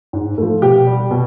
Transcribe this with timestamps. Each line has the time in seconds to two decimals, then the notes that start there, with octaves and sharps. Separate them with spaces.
0.13 G#2
0.38 F3 A3
0.62 B2 G4
0.87 G3
1.11 B2